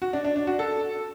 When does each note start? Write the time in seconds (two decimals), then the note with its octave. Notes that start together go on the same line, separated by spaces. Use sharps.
0.02 F#4
0.13 D4
0.25 D4
0.36 D4
0.47 F#4
0.59 A4